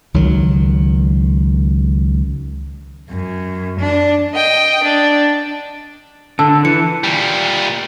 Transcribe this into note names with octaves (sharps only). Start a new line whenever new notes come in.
C#2 D#3 F#3
F#2
D4
D#5 G5
D4
D3 A5 E6
E3 C#7
A#2 G3